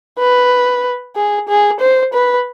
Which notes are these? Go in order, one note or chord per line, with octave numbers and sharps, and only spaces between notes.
B4
G#4
G#4
C5
B4